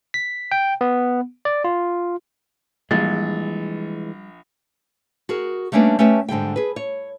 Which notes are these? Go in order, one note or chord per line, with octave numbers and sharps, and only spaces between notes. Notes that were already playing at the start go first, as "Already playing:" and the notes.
B6
G5
B3
D5
F4
A#1 E3 G3 G#3 A6
F#4 G#4 A#4
G3 A3 A#3 C#4 D4 B4
A3 C#4 G4 B4 G5 A5
G#2 D3 G3 G5
G#4 B4
C#5